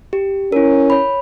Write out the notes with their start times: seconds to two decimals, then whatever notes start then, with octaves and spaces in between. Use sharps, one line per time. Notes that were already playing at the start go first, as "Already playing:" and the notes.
0.13 G4
0.52 C#4 E4 A#4
0.90 C#5 B5